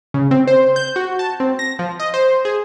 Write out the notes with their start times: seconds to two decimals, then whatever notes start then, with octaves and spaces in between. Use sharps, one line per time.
0.14 C#3
0.31 C4
0.47 C5
0.76 G6
0.96 F#4
1.19 A5
1.40 C4
1.59 A#6
1.79 F3
2.00 D#5
2.14 C5
2.45 G#4